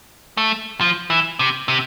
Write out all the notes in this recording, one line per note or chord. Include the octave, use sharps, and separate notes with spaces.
A3
F3
E3
C3
C3